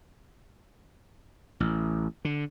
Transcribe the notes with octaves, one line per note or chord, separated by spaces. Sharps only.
A1
D3